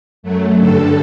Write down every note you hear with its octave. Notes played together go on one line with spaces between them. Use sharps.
F#2 F#3 A3
G2 D3 G3 A4